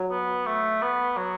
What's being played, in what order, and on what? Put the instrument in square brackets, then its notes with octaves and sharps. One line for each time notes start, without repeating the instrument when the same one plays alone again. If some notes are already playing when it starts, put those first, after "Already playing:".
Already playing: [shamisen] F#3
[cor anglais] B3
A3
B3
F#3